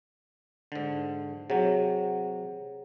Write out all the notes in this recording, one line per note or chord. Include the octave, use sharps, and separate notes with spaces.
G#2 D3
C3 F#3 G#4 C#5 F#5